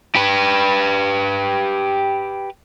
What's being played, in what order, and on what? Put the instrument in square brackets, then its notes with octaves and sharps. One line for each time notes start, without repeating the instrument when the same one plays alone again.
[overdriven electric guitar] G4 B4